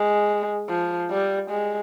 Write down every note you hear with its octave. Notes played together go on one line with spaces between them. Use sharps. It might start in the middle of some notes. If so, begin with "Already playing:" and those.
Already playing: G#3
F3
G3
G#3